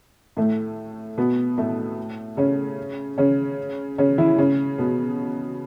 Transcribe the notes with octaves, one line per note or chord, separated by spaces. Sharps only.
A2 A3
B2 B3
A2 A3
C#3 C#4
C#3 C#4
C#3 C#4
E3 E4
C#3 C#4
B2 B3